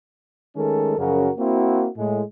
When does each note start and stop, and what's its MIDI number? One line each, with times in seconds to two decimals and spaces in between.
0.56 0.95 51
0.56 0.95 56
0.56 0.95 57
0.56 0.95 61
0.56 0.95 69
0.56 0.95 70
0.98 1.30 42
0.98 1.30 49
0.98 1.30 53
0.98 1.30 61
0.98 1.30 66
0.98 1.30 70
1.38 1.88 58
1.38 1.88 60
1.38 1.88 64
1.38 1.88 66
1.96 2.21 45
1.96 2.21 56